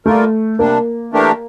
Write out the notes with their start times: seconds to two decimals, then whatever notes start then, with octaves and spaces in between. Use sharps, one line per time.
0.06 G3 A3 A#3 F4 A#4
0.59 C3 G3 A#3 D4
1.13 E3 A3 D4 G4 A#4